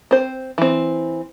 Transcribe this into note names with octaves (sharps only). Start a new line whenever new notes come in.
C4 C5
E3 C4